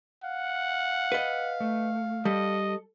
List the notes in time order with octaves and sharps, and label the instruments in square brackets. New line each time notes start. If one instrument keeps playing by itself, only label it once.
[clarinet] F5 [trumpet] F#5
[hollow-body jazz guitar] B4 D#5
[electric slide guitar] A3
[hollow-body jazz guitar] G3 [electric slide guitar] A4 [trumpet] D#5